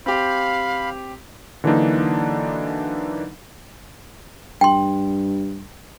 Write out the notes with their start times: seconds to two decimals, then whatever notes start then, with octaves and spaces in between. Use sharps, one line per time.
0.06 C4 G4 F5 B5
1.64 D3 E3 F#3 A#3 D4 D#4
4.61 G2 G5 C6